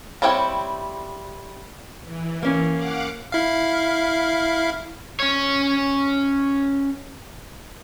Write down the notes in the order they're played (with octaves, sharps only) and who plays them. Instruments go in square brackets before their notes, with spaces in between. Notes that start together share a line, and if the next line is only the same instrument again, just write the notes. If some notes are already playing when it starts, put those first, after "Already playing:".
[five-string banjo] G3 C4 E4 C#5 G5
[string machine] E3
[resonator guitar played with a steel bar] A#3 C#4
[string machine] F5 F#5 D6
[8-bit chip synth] E4 F5
[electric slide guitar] C#4 C#5